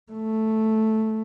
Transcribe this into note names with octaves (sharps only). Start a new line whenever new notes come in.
A3